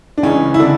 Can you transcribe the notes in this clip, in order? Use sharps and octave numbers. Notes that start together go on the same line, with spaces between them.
D4
C#2 C#3 E3 C#4
E4
D3 D4